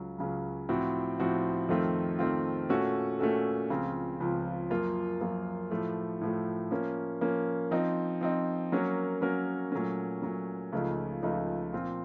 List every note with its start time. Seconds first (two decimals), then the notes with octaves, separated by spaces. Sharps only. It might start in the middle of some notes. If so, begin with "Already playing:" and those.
Already playing: C#2 C#3 F#3
0.18 C#2 C#3 F#3
0.69 A2 F3 C4 F#4
1.20 A2 F3 C4 F#4
1.69 F2 D#3 A3 C4 F4
2.19 F2 D#3 A3 C4 F4
2.69 A#2 A3 C#4 F#4 A4
3.19 A#2 A3 C#4 F#4 A4
3.70 C#2 C#3 F3 C4
4.20 C#2 C#3 F3 C4
4.70 F#2 F3 A#3 F4
5.21 F#2 F3 A#3 F4
5.71 A2 F3 A3
6.21 A2 F3 A3
6.71 F3 A#3 C#4
7.21 F3 A#3 C#4
7.71 F3 C4 D#4
8.21 F3 C4 D#4
8.72 F#3 A#3 C#4 F#4 A#4
9.21 F#3 A#3 C#4 F#4 A#4
9.72 A#2 F#3 A3 C#4
10.22 A#2 F#3 A3 C#4
10.72 C#2 C#3 F3 A3 D#4
11.23 C#2 C#3 F3 A3 D#4
11.73 A#2 F3 C4 F4